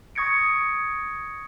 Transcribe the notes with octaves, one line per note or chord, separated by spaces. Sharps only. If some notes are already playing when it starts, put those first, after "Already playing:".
C#6 D#6 G#6 A#6 C#7 D7